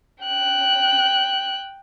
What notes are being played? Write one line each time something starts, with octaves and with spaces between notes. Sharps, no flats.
G5 F#6